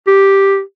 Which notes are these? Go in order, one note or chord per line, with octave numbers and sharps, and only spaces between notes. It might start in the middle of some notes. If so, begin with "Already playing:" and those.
G4